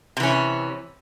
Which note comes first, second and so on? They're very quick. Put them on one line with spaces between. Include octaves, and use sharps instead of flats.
C3 E3 C#4